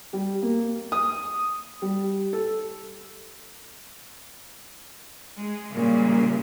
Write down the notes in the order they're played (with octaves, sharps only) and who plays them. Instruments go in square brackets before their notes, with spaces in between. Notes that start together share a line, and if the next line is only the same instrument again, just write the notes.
[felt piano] G3
A#3
D#6
G3
A4
[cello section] G#3
A#2 C#3 G3 G#3 A#3